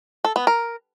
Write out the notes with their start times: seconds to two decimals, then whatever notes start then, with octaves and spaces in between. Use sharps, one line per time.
0.24 A4
0.36 B3
0.47 A#4